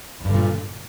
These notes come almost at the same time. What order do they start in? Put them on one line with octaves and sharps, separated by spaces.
E2 G2 D3 A#2